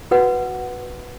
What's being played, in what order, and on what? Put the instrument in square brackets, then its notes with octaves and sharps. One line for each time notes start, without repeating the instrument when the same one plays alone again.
[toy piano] F#4 B4 F#5